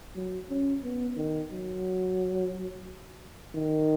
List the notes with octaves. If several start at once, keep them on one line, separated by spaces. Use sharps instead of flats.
F#3
C#4
B3
D#3
F#3
D#3